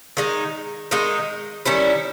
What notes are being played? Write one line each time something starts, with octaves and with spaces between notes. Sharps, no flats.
D#3 G#3 D#4
D#3 G#3 D#4
D#3 G3 C#4 E4